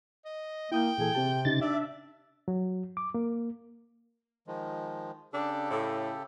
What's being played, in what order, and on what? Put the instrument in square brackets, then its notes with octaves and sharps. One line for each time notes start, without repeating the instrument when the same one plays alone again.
[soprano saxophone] D#5
[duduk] A#3 [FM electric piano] E4 D#6 G6 [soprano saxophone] G5
[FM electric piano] A#2 E3 A4 [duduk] G#4
[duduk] C3 [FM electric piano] C4 G4 A5
[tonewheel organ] C#3 A6 [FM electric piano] D#4 G4
[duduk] D4 [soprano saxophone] D5 [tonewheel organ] E5
[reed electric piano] F#3
D6
A#3
[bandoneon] D#3 F3 G#3
[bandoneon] C#3 G4 A4 [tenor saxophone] D4
[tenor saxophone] A2